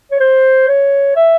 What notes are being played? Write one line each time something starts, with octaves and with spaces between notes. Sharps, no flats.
C#5
C5
C#5
E5